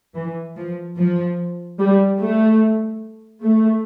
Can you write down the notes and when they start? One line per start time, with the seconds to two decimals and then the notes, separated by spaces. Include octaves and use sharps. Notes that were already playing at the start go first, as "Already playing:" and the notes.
0.14 E3
0.56 F3
0.96 F3
1.79 G3
2.19 A3
3.42 A3